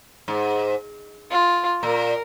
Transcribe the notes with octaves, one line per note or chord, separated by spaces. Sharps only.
G#2
F4
A#2 A#4